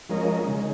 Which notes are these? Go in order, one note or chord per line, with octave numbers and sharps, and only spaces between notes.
F3 G#3 C#4 A#4 D#5
C#3 G#3 D#4